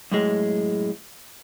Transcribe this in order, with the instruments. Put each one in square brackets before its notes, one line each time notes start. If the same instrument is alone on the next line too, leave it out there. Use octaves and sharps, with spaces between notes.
[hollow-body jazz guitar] F#2 A2 G#3